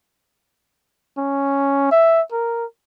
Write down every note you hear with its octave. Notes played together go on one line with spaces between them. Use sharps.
C#4
E5
A#4